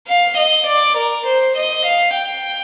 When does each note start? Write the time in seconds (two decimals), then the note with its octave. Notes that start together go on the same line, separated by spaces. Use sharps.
0.08 F5
0.37 D#5
0.67 D5
0.97 A#4
1.26 C5
1.56 D#5
1.85 F5
2.15 G5